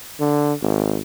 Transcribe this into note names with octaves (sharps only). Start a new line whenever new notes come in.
D3
G#1